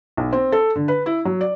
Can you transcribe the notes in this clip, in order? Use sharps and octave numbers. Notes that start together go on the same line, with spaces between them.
B1
C4
A4
D3
B4
E4
F#3
D5